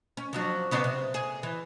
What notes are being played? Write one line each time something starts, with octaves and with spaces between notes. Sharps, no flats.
C#4
F3 F#3 D4
C#3 B3 D4
C3
G#4
E3